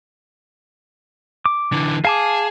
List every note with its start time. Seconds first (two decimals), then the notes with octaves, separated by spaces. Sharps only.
1.46 D6
1.73 D3 E3
2.05 G#4 F5 A5 D6